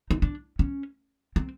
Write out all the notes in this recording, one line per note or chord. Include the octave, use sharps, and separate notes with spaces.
D#4
D4
C#4
C4